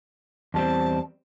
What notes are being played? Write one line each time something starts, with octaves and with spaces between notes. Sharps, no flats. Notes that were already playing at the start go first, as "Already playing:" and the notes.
E2 G3 C4 A5